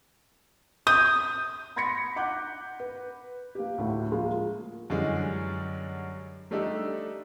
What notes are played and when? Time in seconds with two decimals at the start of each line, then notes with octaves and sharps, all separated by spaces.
0.87 D#6 G6
1.76 B5 C6 G#6 A#6 B6 C#7
2.16 F#5 D6 F#6 G6
2.80 B4
3.55 A#3 G4
3.78 D2 A2
4.11 F3 G#3 A#3
4.90 F#2 D3 E3 G3 G#3
6.51 G3 A3 D4 D#4 G4 A4